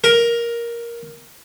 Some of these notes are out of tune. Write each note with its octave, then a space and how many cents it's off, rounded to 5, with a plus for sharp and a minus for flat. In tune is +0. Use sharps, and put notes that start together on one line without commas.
A#4 +10